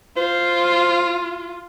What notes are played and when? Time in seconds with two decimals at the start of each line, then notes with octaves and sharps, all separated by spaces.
0.17 F4 C5